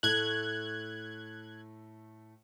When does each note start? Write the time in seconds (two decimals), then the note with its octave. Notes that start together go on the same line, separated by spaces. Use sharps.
0.03 A2 A3 F#6 G#6